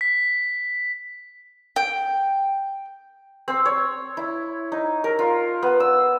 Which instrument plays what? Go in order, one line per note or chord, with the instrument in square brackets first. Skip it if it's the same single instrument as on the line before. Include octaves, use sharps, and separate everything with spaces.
[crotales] B6
[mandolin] G5
[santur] C4
C#5
E4
D#4
A#4
F4
B3
E6